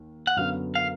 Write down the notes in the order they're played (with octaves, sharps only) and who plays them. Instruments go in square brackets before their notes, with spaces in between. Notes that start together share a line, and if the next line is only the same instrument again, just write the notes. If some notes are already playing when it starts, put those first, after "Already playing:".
Already playing: [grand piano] D#2
[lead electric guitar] F#5
[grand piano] F#2 D3 F#3 B3 [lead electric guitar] F5
[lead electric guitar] F5